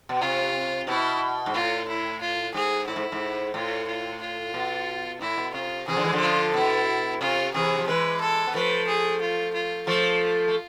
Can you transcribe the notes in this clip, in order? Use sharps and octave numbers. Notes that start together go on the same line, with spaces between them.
B2
C3 F4
B2 E4
G#2
A2 F4
E4
F4
G#2 G#4
A2 E4
G#2
G#2
A2 F4
F4
F4
B2
A2 E4
B2
C3 F4
C3 E3 G#4
D3 F3
E3 G#3
D3 F3
F4
B2 E4
C3 F4
C3 E3 G#4
F3
E3 G#3 B4
A4
B3
F3 A3 B4
G#4
F4
F4
F3 A3 F4
A3